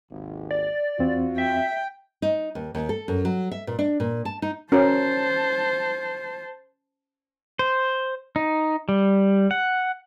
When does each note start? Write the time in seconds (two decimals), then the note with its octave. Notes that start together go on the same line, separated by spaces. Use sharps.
0.11 G#1 D#2
0.51 D5
0.99 E2 C4 F4 F#4
1.38 E5 G5
2.22 D#4
2.55 D#2
2.75 D#2
2.89 A4
3.08 F#2
3.25 F#3
3.51 E5
3.67 A#2
3.79 D4
4.00 A#2
4.25 A5
4.42 D#4
4.72 C#4 F#4 A#4 C5 A5
7.59 C5
8.36 D#4
8.89 G3
9.51 F#5